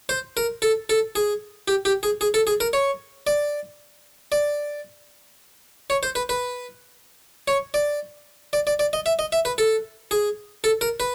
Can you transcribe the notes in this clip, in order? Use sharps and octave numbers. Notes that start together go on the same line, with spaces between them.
C5
A#4
A4
A4
G#4
G4
G4
G#4
G#4
A4
G#4
A#4
C#5
D5
D5
C#5
C5
B4
B4
C#5
D5
D5
D5
D5
D#5
E5
D#5
E5
B4
A4
G#4
A4
A#4
B4